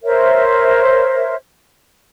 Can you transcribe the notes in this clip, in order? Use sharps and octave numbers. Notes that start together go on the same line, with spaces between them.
A#4 C5 C#5 E5